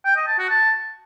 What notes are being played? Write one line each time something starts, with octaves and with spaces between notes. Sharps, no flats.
G5
D#5
A5
F#4
A5